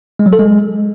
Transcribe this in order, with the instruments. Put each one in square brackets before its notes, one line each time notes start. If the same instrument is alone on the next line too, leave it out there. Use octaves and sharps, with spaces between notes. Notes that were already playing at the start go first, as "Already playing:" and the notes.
[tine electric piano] G#3
F#3
A4
G#3